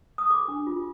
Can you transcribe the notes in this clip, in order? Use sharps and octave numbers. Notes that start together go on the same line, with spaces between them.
D#6
A4 D6
D4
F4